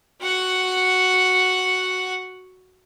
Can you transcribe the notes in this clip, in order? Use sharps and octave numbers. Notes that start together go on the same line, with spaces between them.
F#4 F#5